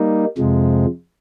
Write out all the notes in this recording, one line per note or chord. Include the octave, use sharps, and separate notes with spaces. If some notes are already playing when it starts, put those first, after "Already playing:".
Already playing: G3 A#3 D#4
F2 C3 F3 G#3